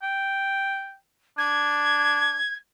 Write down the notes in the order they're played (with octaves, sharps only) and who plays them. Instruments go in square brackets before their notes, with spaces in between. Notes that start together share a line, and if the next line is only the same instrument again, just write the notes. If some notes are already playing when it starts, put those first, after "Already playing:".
[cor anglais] G5
[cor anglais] D4 [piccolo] G#6